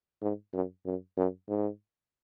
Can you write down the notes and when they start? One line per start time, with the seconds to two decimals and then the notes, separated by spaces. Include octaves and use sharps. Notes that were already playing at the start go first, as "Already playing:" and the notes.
0.22 G#2
0.53 F#2
0.86 F#2
1.17 F#2
1.48 G#2